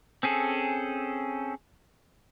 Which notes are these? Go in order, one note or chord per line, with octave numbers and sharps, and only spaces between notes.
C4 C#4 G#4 A4